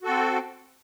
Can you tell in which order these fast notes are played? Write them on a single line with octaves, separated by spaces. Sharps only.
F#4 A4 C4